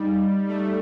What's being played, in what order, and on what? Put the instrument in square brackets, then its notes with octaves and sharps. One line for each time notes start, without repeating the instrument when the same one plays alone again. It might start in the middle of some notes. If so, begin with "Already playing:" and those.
Already playing: [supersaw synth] G3 [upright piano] D#4
[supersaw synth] A3